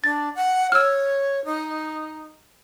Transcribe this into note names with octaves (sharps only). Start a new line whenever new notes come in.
D4 A6
F#5
C#5 E6 F6
D#4